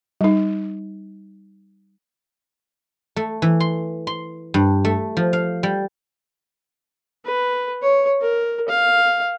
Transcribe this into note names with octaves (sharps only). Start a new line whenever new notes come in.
G3 D#4
A3
E3
C6
C6
G2
A3
F3
F5
G3
B4
C#5
A#4
F5